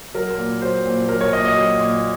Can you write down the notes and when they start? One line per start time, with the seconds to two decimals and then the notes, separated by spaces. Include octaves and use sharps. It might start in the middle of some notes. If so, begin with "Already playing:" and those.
0.14 F#3 A#4
0.38 A#2
0.62 F#3 C5
0.86 A#2
1.09 F#3 A#4
1.21 C#5
1.33 A#2 D#5
1.45 D#5
1.56 F#3
1.80 A#2